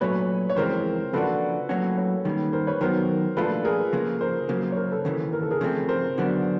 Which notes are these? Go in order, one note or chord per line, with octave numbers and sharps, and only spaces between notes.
A#2 F#3 A3 C#4 B4 C#5
C#5
F2 C#3 E3 G#3 C4 A#4 C5
C#3 F3 A#3 D4 F#4 A4 B4
A2 F#3 A#3 C#4 F#4
B4 C#5
D#3 G3 A#3 C#4
A#4 C5
B4 C#5
D#3 F#3 B3 A#4 C5
A#2 F3 A3 D4 F4 A4 B4
G#4 A#4
C#3 F3 A#3
A#4 C5
C#3 F#3 A#3
C#5
A#4 C5
A4 B4
D#2 C#3 E3
A#4
A4
G#4 A#4
C#3 F3 A3 C4
A#4 C5
D3 F#3 B3 D4